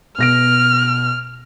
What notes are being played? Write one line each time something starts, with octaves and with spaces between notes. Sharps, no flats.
B2 F6 A#6 D7